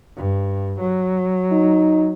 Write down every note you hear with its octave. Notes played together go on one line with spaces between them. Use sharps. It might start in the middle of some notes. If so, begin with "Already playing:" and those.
G2
F#3
D#4